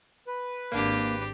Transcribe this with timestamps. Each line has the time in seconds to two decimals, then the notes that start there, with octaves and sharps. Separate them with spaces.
0.27 B4
0.72 G#1 A#3 D4 G4